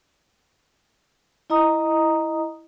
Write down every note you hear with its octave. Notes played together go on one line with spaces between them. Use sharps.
E4 D#5 A#5 D#6